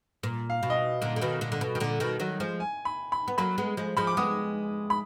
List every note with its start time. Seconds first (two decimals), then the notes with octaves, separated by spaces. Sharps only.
0.23 A#2
0.50 F5
0.63 B2
0.70 D#5
0.76 F5
1.02 A#2 D3
1.16 D3
1.21 B2 D#3
1.41 A#2 D3
1.52 D3
1.61 B2
1.75 D#3
1.80 A#2 D3
2.00 B2 D#3
2.20 D#3 F#3
2.40 F3 G#3
2.60 G#5
2.85 B5
3.12 B5
3.28 B3
3.38 F#3 A#3 B5
3.58 G#3 B3
3.77 F3 G#3
3.97 F3 G#3 B5
4.07 D6
4.17 G#3 B3 D#6
4.90 B5